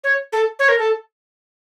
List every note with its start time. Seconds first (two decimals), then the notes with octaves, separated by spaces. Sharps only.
0.04 C#5
0.33 A4
0.59 C#5
0.69 A#4
0.79 A4